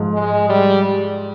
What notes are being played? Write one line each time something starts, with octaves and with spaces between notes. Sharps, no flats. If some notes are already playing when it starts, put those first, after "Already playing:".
Already playing: G#2 F3
G#3
G3